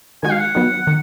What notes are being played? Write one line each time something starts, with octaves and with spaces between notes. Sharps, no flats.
D#3 G#3 D#4 F#4 G#5
F5
F#5
D#3 F#3 B3
D#3